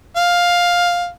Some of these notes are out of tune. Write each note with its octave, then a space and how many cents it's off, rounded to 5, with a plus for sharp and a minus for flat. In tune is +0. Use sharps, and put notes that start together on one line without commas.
F5 +10